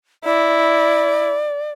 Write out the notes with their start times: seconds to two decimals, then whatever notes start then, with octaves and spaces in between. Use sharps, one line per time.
0.25 E4 D5